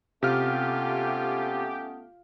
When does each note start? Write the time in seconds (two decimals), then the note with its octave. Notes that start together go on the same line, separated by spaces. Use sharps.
0.23 C3 A3 B3 C#4 F4 G4 F6